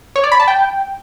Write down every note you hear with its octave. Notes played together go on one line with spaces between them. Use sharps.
C#5
D5
B5
A5
G5